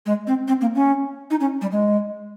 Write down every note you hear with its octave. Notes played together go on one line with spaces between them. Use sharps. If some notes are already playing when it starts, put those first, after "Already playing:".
G#3
C4
C4
A#3
C#4
D#4
C#4
G3
G#3